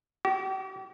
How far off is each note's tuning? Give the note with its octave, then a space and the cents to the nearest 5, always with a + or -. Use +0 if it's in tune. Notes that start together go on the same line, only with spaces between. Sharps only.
G4 -40